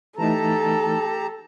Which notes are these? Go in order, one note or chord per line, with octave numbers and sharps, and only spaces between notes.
E3 A3 D#4 G4 A4 A5 A#5